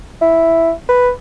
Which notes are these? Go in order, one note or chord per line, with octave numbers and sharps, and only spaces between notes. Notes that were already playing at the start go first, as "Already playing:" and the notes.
E4
B4